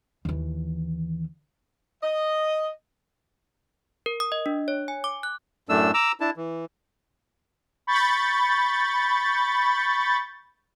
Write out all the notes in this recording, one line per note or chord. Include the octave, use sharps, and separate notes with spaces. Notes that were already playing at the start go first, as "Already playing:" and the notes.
D#2 E3
D#5
A#4
D#6
D#5
D4
C#5
G#5
D6
F#6
F#2 A2 A3 D4 E6
A#5 D6 E6
D4 E4 A5
E3
B5 C#6 G6 A6